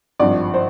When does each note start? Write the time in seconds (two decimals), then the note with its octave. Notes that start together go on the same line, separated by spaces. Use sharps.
0.19 G#1 G2 F3 D5
0.54 C5